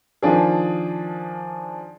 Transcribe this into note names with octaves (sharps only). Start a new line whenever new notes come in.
D#3 F3 D4 G#4